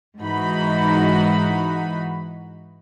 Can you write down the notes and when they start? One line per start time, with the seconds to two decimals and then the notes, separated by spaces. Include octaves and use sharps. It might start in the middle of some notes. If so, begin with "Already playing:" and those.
0.20 G#2 E3 D#4 F#4 B5